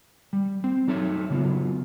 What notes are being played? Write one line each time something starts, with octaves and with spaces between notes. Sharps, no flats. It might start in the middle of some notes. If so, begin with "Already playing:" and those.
G3
C4
F#3 D#4 A4 C#5 E5
C#3 F#3 B3 F4